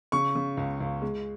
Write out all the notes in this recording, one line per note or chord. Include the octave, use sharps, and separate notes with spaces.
C#3 C#6
C#3
C#2
C#2
G#3